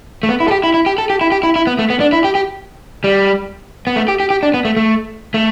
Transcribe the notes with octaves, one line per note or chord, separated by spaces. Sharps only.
A3
B3
E4
A4
G4
E4
E4
G4
A4
G4
E4
G4
E4
E4
B3
A3
B3
D4
E4
G4
G4
G3
B3
A3
G4
G4
G4
D4
B3
A3
A3
A3